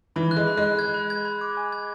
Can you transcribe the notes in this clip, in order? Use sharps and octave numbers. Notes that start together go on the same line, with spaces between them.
E3 B5
F#6
G#3
B5
G#3
F#6
G#6
B5
G#6
B5
D6
G#5
G#6